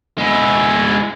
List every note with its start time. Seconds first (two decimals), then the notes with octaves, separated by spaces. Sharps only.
0.18 G#3 E4